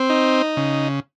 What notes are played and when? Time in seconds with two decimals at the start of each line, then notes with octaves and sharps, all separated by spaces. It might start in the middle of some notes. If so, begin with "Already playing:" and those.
Already playing: C4
0.09 D#4
0.57 C#3